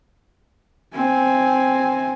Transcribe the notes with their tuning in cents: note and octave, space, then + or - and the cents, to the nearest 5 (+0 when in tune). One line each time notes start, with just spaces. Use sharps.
C4 +0 G#5 +0